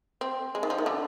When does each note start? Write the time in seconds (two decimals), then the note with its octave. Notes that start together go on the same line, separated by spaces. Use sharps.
0.21 C4
0.55 G#3
0.63 D#3
0.70 F3
0.78 D#3
0.86 D3